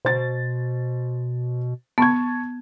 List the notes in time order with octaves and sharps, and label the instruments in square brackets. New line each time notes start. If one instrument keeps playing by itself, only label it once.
[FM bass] B2 [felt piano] C5 A6
[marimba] B3 [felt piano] A5 C#6 G#6